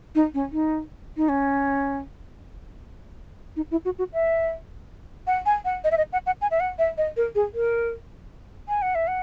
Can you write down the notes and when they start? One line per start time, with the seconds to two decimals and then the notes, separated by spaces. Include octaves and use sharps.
0.15 D#4
0.34 C#4
0.52 D#4
1.17 D#4
1.29 C#4
3.56 D#4
3.71 E4
3.85 F#4
3.98 F#4
4.13 E5
5.27 F#5
5.46 G#5
5.65 F#5
5.84 D#5
5.91 E5
5.97 D#5
6.13 F#5
6.26 F#5
6.41 G#5
6.51 E5
6.60 F#5
6.78 E5
6.98 D#5
7.17 A#4
7.35 G#4
7.54 A#4
8.68 G#5
8.82 F#5
8.95 E5
9.07 F#5